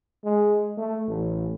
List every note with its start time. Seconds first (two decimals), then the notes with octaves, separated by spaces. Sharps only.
0.25 G#3
0.78 A3
1.08 A1